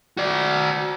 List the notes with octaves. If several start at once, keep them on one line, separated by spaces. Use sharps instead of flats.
F#4 D5